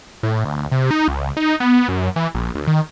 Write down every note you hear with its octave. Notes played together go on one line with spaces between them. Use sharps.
A2
D2
C3
D#4
C#2
D#4
B3
F#2
E3
A#1
D2
D#3